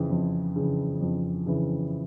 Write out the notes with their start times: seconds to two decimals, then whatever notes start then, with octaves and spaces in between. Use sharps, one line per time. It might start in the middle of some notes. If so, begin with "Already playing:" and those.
Already playing: F2 C#3 E3
0.10 F2
0.56 C#3 E3
1.01 F2
1.46 C#3 E3